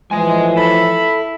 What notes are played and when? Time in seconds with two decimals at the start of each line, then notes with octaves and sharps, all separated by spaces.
0.11 A2 E3 F3 G#3 D#5 G#5
0.57 E4 A4 B5